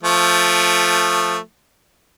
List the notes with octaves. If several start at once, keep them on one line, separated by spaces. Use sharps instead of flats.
F3 A3